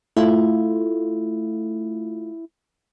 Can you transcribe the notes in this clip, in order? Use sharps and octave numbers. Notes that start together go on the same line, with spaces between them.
A3 E4 F4